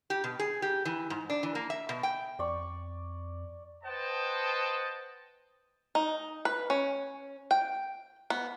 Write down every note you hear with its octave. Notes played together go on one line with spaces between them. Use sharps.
G4
B2
G#4
G4
E3
G#2
D4
E3
A#3
E5
B2
G5
F2 D5 C#6
B4 C5 D#5 F#5 G5 A5
D#4
B4
C#4
G5
B3